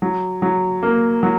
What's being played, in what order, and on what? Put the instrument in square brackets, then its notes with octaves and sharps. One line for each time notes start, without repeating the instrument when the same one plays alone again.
[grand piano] F#3
F#3
A#3
F#3